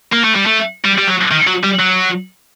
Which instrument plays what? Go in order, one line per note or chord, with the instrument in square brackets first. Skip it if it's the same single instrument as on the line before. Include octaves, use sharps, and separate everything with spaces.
[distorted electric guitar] A#3
A3
G3
A3
G3
G3
F#3
D#3
F#3
G3
F#3